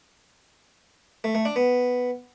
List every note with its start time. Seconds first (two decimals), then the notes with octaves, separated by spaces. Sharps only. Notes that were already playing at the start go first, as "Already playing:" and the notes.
1.24 A3
1.35 A3
1.45 D4
1.56 B3